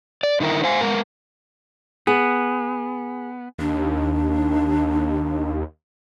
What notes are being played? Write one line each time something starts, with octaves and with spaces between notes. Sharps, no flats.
D5
D3 D#3 E4 A#4
C5 F5 G#5
G#3 B3 A#4
B3 G#4
D#2 D4